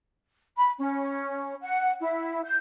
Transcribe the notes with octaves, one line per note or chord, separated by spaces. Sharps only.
B5
C#4
F#5
E4
G6